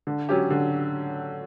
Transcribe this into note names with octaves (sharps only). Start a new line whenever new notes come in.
D3
F#3 C#4 G4
D3